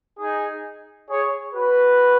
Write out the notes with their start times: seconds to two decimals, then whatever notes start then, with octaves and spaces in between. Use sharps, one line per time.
0.19 D#4 G#4
1.09 G#4 C#5
1.54 F#4 B4